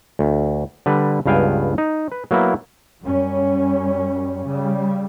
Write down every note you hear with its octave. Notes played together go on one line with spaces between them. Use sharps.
D2
D3 G3 B4
C#2 G2 B3 F5 G5 G#5
D#4
B4
F#3 A#3 B3 E4
F#2 G3 C#4
C#3 G3